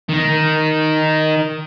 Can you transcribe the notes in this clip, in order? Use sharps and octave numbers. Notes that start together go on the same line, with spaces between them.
D#3 D#4